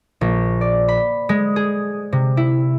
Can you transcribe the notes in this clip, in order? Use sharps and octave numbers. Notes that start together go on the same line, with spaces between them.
A#1
D5
B5
G#3
G#4
C3
E4